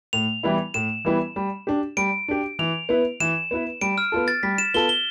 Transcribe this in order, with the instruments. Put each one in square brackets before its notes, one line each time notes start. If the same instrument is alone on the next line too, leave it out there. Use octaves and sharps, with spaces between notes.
[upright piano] A2 [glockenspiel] F7
[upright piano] E3 G3 B3 E4
[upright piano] A2 [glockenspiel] E7
[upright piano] E3 G3 B3 E4
G3
D4 G4
[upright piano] G3 [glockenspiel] D7
[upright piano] D4 G4
[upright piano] E3 [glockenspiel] F7
[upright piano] B3 E4 B4
[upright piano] E3 [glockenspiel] E7
[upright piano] B3 E4 B4
[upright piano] G3 [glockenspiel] D7
[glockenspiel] F6
[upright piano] B3 F4 A4
[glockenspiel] A6
[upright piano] G3 [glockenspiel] B6
[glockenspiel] E7
[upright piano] B3 F4 A4 [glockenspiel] G7
[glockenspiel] G7